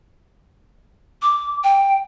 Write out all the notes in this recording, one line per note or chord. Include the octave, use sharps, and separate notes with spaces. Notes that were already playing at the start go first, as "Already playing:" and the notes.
D6
G5